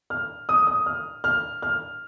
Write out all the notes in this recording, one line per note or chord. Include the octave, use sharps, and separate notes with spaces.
F6
D#6
D#6
F6
F6
F6